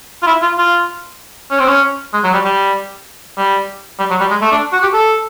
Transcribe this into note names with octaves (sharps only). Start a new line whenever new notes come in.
F4
E4
F4
F4
C#4
C4
C#4
G#3
F#3
G3
G3
G3
G3
F#3
G3
G#3
A3
D4
F#4
G4
A4